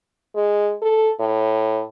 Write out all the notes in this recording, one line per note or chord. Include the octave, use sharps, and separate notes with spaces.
G#3
A4
A2